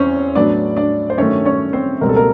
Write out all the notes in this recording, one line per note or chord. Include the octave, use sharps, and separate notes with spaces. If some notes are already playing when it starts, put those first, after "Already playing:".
Already playing: E2 E3 C4 C#4 C5 C#5
A2 F#3 B3 D4 D5
D4 D5
C5
G2 D#3 F#3 A3 C#4 C#5
C#4 C#5
C4 C5
C#2 B2 G3 C4 A#4
A4
A#3 A#4